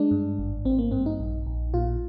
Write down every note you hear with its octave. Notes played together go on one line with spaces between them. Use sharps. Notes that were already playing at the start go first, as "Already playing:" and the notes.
Already playing: G#3 D4
G2
G#1
G#1 C4
A#3
G2 C4
D#4
A#1
A#1
A#2 F4